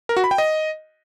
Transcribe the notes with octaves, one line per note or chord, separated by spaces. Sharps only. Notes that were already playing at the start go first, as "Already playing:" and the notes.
A#4
F#4
B5
G5
D#5